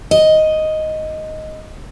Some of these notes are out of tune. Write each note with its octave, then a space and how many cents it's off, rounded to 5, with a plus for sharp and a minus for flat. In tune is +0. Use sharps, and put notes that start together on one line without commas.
D#5 +5